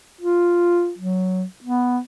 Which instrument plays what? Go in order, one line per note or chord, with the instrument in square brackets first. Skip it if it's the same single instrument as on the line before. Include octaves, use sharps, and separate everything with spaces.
[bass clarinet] F4
F#3
B3